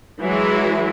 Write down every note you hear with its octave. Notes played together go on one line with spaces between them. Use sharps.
E3 F#3 G#3 E4